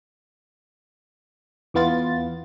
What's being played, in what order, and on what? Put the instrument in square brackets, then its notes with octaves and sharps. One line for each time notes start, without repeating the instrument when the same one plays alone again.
[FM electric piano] E2 E3 B3 F4 A6